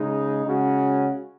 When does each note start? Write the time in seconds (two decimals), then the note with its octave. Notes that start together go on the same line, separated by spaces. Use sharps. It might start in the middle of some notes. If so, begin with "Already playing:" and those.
Already playing: C#3 G#3 D#4
0.46 C#3 G#3 C#4 F#4